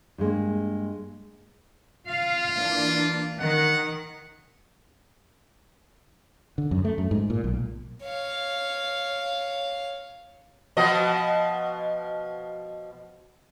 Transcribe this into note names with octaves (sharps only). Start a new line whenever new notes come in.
G2 G3 G#3 A#3
F4 F5
E3 A#3 D4
D#3 F#5
D3
F#2
A3
F#2
G#2
A#2
B1
C#5 F5
B2 F3 D#5